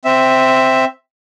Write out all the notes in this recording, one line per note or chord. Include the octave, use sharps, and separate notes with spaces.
C4 E5